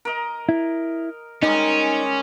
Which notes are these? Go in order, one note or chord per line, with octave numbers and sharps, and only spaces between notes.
A#4 D#5
E4
D#3 G3 G#3 C#4 D#4